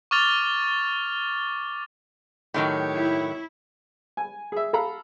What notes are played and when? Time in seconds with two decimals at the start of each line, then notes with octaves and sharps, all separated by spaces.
0.11 C#6 D6 F6 A6 F7 G7
2.54 A2 D#3 F#3 G4 C#5
2.94 E4
4.17 G#5
4.52 G#4 E5
4.73 A4 F5 A#5 B5